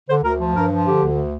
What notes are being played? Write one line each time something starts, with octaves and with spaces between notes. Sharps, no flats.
D3 C5
D2 A#4
F3
G2 A#4
F3
D3 G4
D2